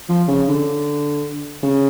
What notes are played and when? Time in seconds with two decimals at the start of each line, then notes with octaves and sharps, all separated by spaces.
0.09 F3
0.28 C#3
0.48 D3
1.63 C#3